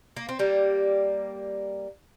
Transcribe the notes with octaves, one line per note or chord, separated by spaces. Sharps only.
A#3
C4
G3 A#3